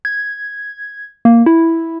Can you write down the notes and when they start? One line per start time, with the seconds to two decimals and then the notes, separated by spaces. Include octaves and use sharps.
0.05 G#6
1.25 A#3
1.46 E4